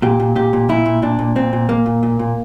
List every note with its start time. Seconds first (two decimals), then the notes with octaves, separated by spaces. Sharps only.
0.02 A#2 G4
0.20 A#2
0.36 A#2 G4
0.53 A#2
0.69 A#2 E4
0.86 A#2
1.02 A#2 D4
1.19 A#2
1.36 A#2 C4
1.53 A#2
1.69 A#2 A#3
1.86 A#2
2.03 A#2
2.19 A#2